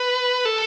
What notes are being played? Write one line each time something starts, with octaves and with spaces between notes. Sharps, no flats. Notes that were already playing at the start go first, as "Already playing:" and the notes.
Already playing: B4
A4